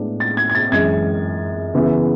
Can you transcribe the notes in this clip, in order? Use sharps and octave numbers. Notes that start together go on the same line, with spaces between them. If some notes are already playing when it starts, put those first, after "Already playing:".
Already playing: A2 G#3 B3 D4
A6
G#6
G#6
A6
F#2 E3 G#3 G#6
C#3 E3 B3 E4